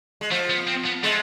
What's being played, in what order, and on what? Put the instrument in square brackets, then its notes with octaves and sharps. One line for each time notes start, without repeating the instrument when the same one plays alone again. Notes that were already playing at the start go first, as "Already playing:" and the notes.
[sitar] G#3
[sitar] F3 [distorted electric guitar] A3
[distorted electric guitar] B3
C4
B3
[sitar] G#3 [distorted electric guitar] A3